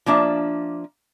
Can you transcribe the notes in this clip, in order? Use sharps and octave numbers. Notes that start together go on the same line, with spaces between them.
F3 A#3 D4 E5